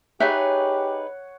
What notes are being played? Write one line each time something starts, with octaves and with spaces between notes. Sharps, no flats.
D#4 G4 G#4 B4 C#5 E5 F#5